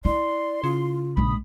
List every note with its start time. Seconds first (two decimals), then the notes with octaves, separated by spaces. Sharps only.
0.05 E4 D5 C6
0.64 C#3 F4
1.17 A#1 G#3 B5 D#6